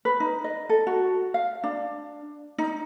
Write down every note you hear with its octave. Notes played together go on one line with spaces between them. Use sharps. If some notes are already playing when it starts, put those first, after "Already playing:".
B4
D#4
D#5
A4
F#4
F5
D4
D#4